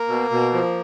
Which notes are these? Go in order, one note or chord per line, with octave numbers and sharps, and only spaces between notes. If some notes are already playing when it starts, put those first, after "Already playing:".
Already playing: A#3
B2
B2
F3